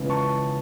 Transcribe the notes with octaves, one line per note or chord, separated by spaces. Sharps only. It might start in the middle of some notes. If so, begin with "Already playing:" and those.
Already playing: C#2 C#3 E3 B3
A5 C#6